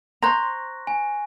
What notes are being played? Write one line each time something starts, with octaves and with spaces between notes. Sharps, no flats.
C5 A#5 C6 C#6 F#6 A#6
G#5